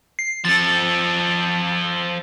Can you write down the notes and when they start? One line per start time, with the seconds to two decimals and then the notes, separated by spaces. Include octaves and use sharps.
0.19 C7
0.45 F3 A4 A6